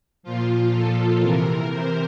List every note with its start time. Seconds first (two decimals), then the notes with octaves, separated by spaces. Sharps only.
0.23 A#2 F3 F4
0.72 A4
1.21 C3 E3 A#4
1.71 C5